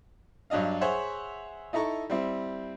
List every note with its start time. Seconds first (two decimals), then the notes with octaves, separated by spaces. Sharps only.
0.50 G2 F#3 D4 D#5 F5
0.81 G#4 C5 C#5 E5 F#5
1.73 D#4 E4 A4 A#5 C#6
2.10 G3 C4 E4